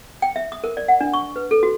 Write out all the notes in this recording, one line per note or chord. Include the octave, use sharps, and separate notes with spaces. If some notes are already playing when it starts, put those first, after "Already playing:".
G5
E5
D#6
A#4
D5
F#5
D4
C#6
B4
A4
F#4